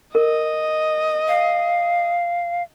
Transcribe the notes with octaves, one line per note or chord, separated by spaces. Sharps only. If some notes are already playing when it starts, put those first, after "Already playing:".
A#4 D#5
F5